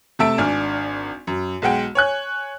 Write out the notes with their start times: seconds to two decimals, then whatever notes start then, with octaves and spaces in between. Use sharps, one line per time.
0.19 C3 A3 E5 A5 E6 D7
0.38 G#1 D4 G#5 F6
1.27 F#2
1.62 B1 G#3 F#5 G5
1.95 C#5 G#5 F#6